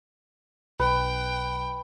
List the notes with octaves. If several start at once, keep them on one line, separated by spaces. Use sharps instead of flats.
B1 B4 G5